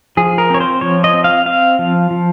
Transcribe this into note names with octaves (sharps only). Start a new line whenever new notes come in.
F3 G#4
A#4
C4 C#5
C5
F3 C#5
D#5
C4
F5
C4 F5
F3
F3